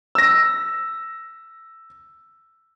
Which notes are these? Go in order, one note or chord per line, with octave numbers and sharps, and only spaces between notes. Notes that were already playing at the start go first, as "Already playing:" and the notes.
E6 A#6